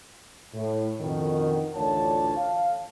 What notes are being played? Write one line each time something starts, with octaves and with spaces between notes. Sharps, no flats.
A2
F2 B2 D3 D#3
A1 D2 D4 F4 C#5 A5
F5